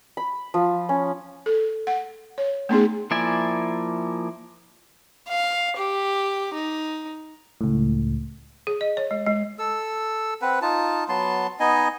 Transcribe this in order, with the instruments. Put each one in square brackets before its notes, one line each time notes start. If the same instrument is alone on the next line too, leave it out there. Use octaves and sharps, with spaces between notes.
[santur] B5
F3
C#4
[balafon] A4
F#5
C#5
A3 B3 C#4 D#4 G#4
[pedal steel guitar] F3 A#3 E4 D5 G#5
[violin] F5
G4
D#4
[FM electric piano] C#2 A2
[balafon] G#4
D#5
C#5
G#3
G#3
[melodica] A4 E6
C4 B4 F#5
D#4 F4 A5
F#3 B3 A5 C6
B3 D#4 D#5 G#5